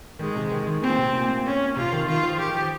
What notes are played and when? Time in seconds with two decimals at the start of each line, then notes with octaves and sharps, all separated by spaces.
0.19 D#3 G#3
0.36 C3
0.51 D#3
0.67 D#3
0.82 A#2 C4
0.98 C3
1.13 A#2
1.29 A#2
1.46 C#4
1.76 C3 F4
1.92 D#3
2.08 D#3 F4
2.23 F3
2.39 D#3 G4
2.55 F3